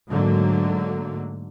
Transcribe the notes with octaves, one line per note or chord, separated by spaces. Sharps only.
G#2 D3 F#3 A3 A#3